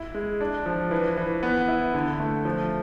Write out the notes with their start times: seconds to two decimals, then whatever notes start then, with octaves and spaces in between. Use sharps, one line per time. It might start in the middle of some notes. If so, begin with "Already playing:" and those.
Already playing: E4
0.14 G#3
0.41 D4
0.66 F3
0.91 E3
1.17 E3
1.43 B3
1.68 E4
1.94 D3
2.20 A3
2.45 F3